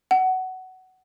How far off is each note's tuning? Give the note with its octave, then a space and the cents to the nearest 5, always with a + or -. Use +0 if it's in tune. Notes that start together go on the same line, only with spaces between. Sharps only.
F#5 +15